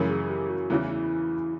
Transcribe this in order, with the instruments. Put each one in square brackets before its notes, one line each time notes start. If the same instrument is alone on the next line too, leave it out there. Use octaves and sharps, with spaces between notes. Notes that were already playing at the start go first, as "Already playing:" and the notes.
Already playing: [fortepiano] F#2 C#3 E3
[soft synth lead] G#4
G#4
G4
F#4
[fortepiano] E2 C#3 E3 [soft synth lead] E4
[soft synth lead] E4